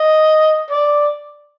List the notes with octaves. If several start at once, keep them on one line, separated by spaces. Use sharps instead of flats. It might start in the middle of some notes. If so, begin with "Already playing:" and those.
Already playing: D#5
D5